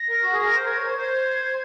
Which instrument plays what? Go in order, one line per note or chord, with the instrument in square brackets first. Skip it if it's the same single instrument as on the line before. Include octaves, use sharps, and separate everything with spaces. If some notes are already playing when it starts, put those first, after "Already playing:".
Already playing: [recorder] A#6
[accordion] A#4
F#4
G#4
A#4
C5
[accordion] A#4 [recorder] G#6
[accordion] C#5
C5
C5